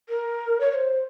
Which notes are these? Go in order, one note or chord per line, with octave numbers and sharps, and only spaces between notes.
A#4
C#5
C#5
C5